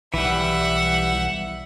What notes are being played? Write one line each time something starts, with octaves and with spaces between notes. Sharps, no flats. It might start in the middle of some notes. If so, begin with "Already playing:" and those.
B1 E3 G3 E5 F#5